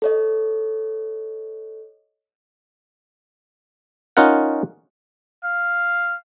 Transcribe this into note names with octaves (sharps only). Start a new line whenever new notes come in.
A4 C#5 D#5
C#4 D#4 F4 A#4 F#5
F5